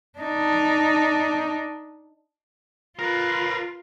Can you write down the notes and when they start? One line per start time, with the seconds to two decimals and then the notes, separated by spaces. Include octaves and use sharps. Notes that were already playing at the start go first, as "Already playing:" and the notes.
0.19 D4 D#4
2.99 F4 A#4 B4